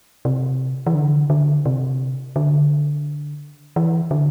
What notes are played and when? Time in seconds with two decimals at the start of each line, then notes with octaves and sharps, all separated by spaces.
0.25 C3
0.87 E3
0.95 D3
1.30 D3
1.66 C3
2.36 D3
3.76 E3
4.11 D3